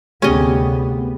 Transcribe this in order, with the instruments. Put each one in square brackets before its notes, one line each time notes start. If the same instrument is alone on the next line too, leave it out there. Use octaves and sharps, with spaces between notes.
[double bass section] D2 C3 B3 [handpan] A3 G4 G#4 [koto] C#4 D#5